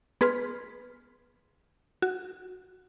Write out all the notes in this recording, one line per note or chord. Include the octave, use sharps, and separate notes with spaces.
B3 G#4 B4 C6 F6
F#4